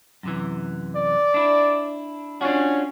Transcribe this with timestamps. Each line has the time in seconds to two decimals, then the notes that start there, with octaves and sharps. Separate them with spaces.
0.23 F#2 C3 E3
0.96 D5
1.34 D4 E4
2.41 C#4 D4 F4 F#4